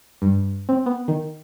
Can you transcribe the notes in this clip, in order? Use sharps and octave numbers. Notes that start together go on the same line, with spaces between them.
G2
C4
B3
D#3